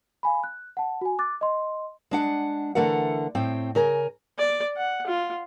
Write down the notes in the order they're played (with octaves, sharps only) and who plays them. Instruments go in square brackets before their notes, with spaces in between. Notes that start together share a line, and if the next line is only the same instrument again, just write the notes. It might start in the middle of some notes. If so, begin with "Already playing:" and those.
[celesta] F5 G#5 B5
F#6
F#5 A5
F#4 G#5
D6 F#6 A6
D#5 C6
[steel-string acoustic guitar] G#3 D4 F#5
D3 E3 A3 A#4 F#5
A2 C4 G5
C#3 A#4 G#5
[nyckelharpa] D5
F#5
F4